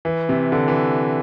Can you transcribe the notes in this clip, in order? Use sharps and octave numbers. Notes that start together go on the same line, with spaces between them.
E3
C3
D3
E3